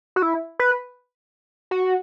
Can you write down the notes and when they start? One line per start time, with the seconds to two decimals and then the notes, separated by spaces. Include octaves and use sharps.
0.16 F#4
0.22 E4
0.59 B4
1.71 F#4